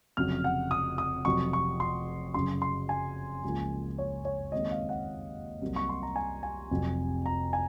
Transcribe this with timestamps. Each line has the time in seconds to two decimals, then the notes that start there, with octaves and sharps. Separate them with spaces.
0.17 F1 F2 C#3 F#3 F6
0.44 F#5
0.71 D#6
0.98 D#6
1.25 F1 F2 C3 F#3 C#6
1.53 C#6
1.80 C6
2.34 F#2 C#3 F#3 C6
2.62 C6
2.89 G#5
3.43 C#2 C#3 F3 A#3
3.98 C#5
4.25 C#5
4.52 D#2 D#3 G#3 C4 D#5
4.71 F5
4.89 F#5
5.62 C2 C3 F#3 A#3
5.76 C#6
5.89 C6
6.03 A#5
6.16 G#5
6.43 G#5
6.71 F1 F2 C3 F#3 C4
7.26 A#5
7.53 G#5